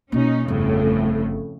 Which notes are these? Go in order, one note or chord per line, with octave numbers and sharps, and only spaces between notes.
B2 A#3 C#4 D#4
G1 F2 A2 C#3